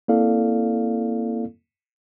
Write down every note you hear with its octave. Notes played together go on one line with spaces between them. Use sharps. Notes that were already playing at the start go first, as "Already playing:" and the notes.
A#3 C4 E4 A4 D5 F5